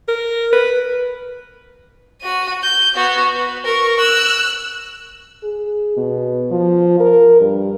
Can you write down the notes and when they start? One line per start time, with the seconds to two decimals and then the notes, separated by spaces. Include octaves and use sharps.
0.08 A#4
0.53 B4
2.22 F#4 D#7
2.63 G6
2.96 B3 F#4
3.35 B4
3.65 A#4 C#6
4.00 E6 F#6
5.44 G#4
5.97 B2
6.51 F3
7.00 A#4
7.41 G2